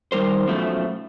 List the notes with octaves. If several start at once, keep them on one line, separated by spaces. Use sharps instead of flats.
D#3 G3 A#4 C5
F#2 B2 F3 A3